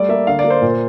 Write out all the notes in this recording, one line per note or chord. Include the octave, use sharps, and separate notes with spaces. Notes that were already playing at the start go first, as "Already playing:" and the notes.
Already playing: G3 A3 D5
A#3 E5
D3 F5
D5
A#3
C5
A#2